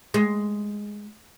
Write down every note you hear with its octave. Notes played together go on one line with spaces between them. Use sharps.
G#3